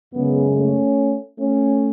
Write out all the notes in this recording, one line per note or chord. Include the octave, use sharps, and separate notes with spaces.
F#2 C#3 G#3 B3
A3 C#4
A3 C#4